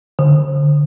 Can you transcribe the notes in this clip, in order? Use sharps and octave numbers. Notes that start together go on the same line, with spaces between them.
D3